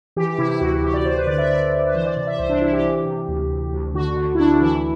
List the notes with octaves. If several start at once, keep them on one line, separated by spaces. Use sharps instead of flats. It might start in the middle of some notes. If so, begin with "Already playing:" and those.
E3 G4
G4
C3 E4
E4
D2 F#4
E4
D2 G4
D5
D2 C5
B4
D3 D5
E5
D3 D5
D2
B4
E3 C5
D5
C3 D5
E5
C2 C5
D4
C2 E4
G4
E3
C3
D2
D2
D2
D3 F#4
D3
E4
D2 D4
E3 E4